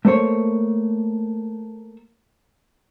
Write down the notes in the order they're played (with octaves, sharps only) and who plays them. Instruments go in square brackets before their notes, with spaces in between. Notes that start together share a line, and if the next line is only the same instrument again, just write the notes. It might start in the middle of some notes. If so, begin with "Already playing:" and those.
[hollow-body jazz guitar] A3 A#3 C5 C#5